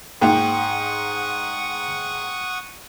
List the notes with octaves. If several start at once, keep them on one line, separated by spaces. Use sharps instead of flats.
G#2 A#3 F4 F#5 G5 C#6 D#6